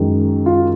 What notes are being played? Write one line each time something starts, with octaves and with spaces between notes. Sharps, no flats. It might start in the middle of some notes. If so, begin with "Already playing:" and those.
Already playing: F#2 D#3 G#3
F4